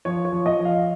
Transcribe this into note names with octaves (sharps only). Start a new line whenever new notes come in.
F3 C#5
C#5
F3
D#5
F3
F5